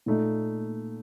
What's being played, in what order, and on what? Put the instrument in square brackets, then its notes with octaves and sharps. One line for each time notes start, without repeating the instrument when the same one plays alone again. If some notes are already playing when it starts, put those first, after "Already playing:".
[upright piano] A#2 A3 D#4